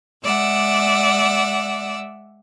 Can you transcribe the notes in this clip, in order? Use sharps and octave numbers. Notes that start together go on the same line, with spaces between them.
G#3 D5 E5 F#5 E6